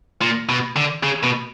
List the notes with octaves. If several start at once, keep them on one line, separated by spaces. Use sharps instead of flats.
A#2
B2
D3
C#3
B2